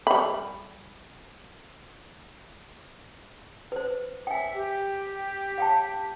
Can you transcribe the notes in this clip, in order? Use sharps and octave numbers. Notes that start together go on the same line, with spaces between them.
G3 B5
B4 C5
E5 G5 G#5
G4
F5 G5 A5